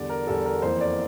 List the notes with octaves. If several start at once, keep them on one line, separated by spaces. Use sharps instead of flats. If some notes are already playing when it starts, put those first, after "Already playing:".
Already playing: E2 D3 G3 D5
A#4
E2 D3 G3 A4
A#4
F2 E3 A#3 C5
D5